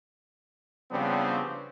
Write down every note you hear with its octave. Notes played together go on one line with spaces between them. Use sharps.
C#3 F3 G3 B3 C4 D4